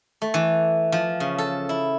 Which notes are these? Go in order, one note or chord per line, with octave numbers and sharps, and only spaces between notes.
A3
E3
F3
C#3
A4
E4